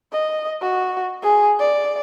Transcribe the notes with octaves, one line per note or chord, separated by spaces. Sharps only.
D#5
F#4
G#4
D5